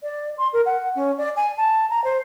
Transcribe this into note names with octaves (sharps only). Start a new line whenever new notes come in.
D5
C6
A#4
F#5
C#4
D5
G#5
A5
A#5
C5